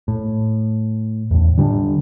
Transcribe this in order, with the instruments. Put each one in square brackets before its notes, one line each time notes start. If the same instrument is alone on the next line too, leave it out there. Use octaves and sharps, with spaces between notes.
[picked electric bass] A2
E2 A2
D3 G3 G#3 D4